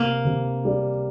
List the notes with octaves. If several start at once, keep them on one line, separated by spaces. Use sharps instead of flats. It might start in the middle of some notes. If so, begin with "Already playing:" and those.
Already playing: C3 A#3
C3
G3